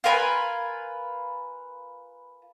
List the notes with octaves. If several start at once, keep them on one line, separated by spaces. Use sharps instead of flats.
F4 A#4 B4 G#5